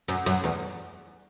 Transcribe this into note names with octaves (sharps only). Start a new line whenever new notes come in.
F#2
F#2
E2